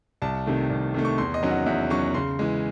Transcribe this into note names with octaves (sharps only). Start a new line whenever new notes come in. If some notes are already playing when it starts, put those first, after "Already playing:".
C2 A5
C3 D#3 A3
C2
C3 D#3 A3
C#6
E2 C6
D#5
D#3 F#3 C#4
F#5
E2 E5
D#3 F#3 C#4 C#6
C#3 C6
E3 G#3